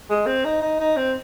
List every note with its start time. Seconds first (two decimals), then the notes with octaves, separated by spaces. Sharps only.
0.10 G#3
0.26 C4
0.45 D#4
0.62 D#4
0.80 D#4
0.97 C4